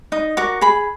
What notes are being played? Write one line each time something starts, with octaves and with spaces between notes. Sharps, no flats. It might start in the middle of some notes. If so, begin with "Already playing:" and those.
D#4 D#6
F#4 A#4 D6
G#4 B5